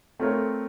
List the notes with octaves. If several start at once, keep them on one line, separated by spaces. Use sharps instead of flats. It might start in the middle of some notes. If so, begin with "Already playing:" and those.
A3 C4 F4 A#4 C#5